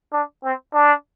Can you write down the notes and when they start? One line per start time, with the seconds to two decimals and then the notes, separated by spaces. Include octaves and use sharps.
0.13 D4
0.43 C4
0.74 D4